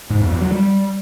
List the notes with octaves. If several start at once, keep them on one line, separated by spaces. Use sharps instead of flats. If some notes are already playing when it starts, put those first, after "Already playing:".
G#2
E2
E2
F#3
G3